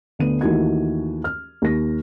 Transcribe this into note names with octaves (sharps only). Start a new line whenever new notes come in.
D2 D3 B3 D#7
D#2 D#3 E3 A3 F#4 G#6
F6
D#2 A#6